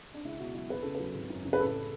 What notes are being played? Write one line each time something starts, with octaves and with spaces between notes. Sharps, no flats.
D4
C#2 E4
B2 F#4
F#3 E4
E2 B4
C#3 A4
B4
F#3
G#1
F#2
C#3
B4
A1 A4